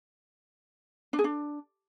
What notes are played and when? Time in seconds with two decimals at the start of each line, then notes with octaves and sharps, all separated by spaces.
1.13 D4
1.19 G#4
1.24 D4